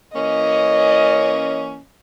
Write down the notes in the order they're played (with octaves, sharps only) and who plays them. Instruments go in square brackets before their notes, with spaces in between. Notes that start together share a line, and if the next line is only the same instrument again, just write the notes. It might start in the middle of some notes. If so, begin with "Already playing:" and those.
[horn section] E3 A#3 C#4 [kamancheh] D#5